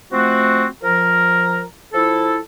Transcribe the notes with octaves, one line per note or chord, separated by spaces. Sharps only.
F3 A3 C4 F#4
F3 A#4
F3 E4 A4